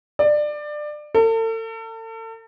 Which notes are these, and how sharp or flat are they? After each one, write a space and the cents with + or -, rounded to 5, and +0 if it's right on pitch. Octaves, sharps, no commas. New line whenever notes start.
D5 +20
A4 +40